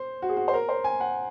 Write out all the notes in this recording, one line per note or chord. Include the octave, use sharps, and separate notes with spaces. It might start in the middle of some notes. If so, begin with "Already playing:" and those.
Already playing: C5
F#4
G#4
F#4
C5
A#4
C5
G#5
F#5